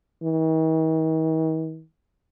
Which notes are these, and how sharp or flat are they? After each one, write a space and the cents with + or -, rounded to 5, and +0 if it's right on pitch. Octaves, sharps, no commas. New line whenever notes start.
D#3 +45